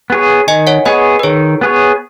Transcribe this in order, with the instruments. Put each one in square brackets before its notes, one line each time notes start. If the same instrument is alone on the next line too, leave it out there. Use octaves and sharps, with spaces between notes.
[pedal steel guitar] B3 G#4 C#5
[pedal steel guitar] D#3 [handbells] D#5 G#5
[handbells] C#5 F#5
[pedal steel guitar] B3 G#4 C#5 [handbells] D#5 G#5
[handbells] B4
[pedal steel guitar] D#3 [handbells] G#4 C#5
[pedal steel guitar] B3 G#4 C#5